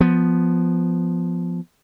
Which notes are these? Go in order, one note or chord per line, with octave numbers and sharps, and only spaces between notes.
F3 B3